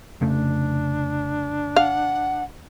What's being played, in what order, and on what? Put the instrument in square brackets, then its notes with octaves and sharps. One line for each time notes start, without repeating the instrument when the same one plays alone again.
[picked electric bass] F1 C#3 A3 [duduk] D4
[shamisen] F5 [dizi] F#5